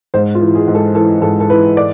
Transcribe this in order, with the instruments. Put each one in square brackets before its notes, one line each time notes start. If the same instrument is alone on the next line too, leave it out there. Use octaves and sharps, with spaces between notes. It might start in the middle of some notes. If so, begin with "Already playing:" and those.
[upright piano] G#2 C5
F4
E3
G#4
G#2
A4
E3 A4
G#2 A4
A4
E3 B4
D5